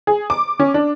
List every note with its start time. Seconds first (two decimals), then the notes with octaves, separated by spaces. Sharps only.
0.07 G#4
0.30 D6
0.60 C#4
0.74 D4